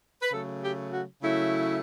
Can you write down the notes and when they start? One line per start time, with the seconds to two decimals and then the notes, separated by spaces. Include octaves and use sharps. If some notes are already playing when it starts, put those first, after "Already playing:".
0.22 B4
0.32 C#3 F#3 A3 A4
0.62 G4
0.93 F#4
1.22 C#3 F#3 A3 E4